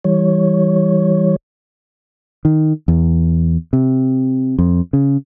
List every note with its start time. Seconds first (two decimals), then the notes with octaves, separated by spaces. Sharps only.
0.05 E3 G3 C#5
2.45 D#3
2.88 E2
3.73 C3
4.58 F2
4.93 C#3